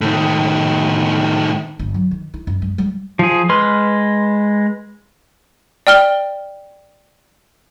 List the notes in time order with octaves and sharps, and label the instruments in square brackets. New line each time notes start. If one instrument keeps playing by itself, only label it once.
[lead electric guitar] A2 D#3
[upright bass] G1
F#3
D#3
E4
F#2
G3
G3
[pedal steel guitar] F3 G#4
G#3 B4 C6 F6
[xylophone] D5 G5 F6 G7